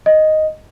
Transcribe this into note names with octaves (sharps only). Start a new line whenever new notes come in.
D#5